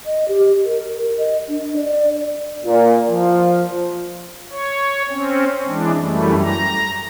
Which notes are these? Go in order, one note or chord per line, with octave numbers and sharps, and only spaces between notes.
D#5
G4
A#4
D#5
D4
D5
A#2
F3
C#5
C4 C#4
E3 G#3 D4
F#2 E3 G3 A3
A#5